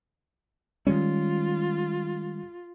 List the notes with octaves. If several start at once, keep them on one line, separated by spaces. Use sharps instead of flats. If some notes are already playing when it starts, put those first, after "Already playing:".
D#3 G3 G#3 C#4 F4